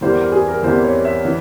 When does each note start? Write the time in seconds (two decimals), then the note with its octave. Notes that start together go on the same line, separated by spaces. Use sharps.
0.01 E2 E3 G3 A#3 E4 C5
0.17 A#4
0.32 G#4
0.48 A#4
0.63 E2 E3 G3 A#3 E4 C5
0.84 C#5
1.05 E5
1.25 E3